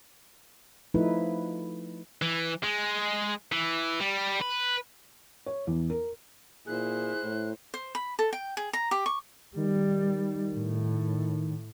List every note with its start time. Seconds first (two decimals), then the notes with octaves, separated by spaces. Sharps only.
0.94 F3 A3 D#4 E4 B4
2.22 E3
2.64 G#3
3.52 E3
4.00 G3
4.41 B4
5.46 C#5
5.67 E2
5.90 A#4
6.67 A#2 E4 G#4 C5 F#6
7.24 A2
7.74 C5
7.95 B5
8.19 A4
8.33 G5
8.57 G#4
8.73 A#5
8.91 G4
9.06 C#6
9.56 D#3 G3
10.53 A2